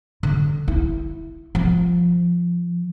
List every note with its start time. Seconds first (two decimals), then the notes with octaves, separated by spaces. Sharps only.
0.23 D3
0.68 E4
1.55 F3